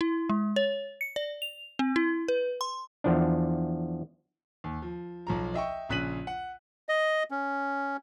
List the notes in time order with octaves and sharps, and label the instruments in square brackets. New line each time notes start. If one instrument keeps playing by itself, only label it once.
[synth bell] E4
G#3
C#5
C#7
D5
F7
C4
E4
B4
C6
[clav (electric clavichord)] E2 F3 D4
[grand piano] D#2
F3
B1 F3 A#5
D#5 E5 G5 C#6
A#1 C#3 F#6 B6 D#7 F#7
F#5
[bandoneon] D#5
C#4